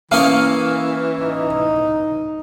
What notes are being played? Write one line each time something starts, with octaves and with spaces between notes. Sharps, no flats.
E3 A#3 C#4 A#4 F5 D#6
D#4